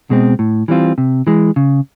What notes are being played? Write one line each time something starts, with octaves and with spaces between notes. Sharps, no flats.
B2 G#3 C4
A2
E3 G3 C4 F4
C3
E3 G#3
C#3